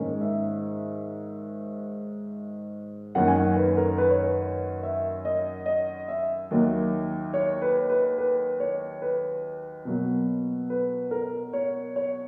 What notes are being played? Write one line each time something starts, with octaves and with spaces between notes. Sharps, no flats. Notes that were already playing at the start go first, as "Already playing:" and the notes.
Already playing: G#2 D#3 A#3 C#4
E5
F#2 D#3 A#3 C#4 F#5
G#5
F#5
B4
A#4
B4
C#5
B4
E5
D#5
D#5
E5
D#2 D#3 F#3 A#3
C#5
B4
B4
B4
C#5
B4
B2 F#3 A#3
B4
A#4
C#5
C#5